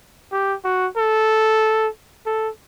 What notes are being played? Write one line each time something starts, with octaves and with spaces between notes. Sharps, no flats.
G4
F#4
A4
A4